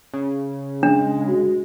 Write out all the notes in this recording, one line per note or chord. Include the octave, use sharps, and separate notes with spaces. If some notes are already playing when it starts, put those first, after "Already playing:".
C#3
G#3 D4
F#4